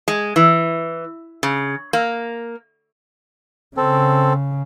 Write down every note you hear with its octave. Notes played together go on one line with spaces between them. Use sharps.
G#3
E3
C#3
A#3
C#3 C4 A4